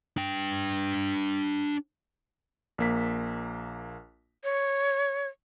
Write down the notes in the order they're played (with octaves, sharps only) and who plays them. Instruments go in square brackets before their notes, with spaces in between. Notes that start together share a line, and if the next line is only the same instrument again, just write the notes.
[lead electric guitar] D4 G5
[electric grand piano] A#1 A#3 B6
[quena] C#5